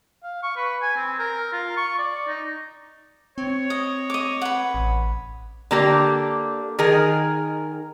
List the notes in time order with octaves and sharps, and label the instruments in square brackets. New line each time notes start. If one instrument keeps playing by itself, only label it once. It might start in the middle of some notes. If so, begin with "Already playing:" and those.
[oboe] F5
C#6
B4
G#5
C4
A#4
F4
C#6
D5
D#4
[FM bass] C4 [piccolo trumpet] C#5
[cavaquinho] D#5
D#5 D6
B4 F#5
[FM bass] A1
[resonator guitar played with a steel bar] D3 A#3 G4
D#3 G#4 A#4